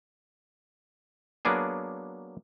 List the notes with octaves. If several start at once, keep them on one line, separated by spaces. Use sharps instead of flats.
F#3 A#3 B3 D4 G#4